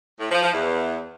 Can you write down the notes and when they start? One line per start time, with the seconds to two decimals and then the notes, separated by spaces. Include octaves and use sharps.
0.20 A2
0.31 F3
0.42 F3
0.53 E2